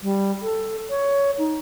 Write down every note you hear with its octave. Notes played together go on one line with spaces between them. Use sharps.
G3
A4
C#5
D#4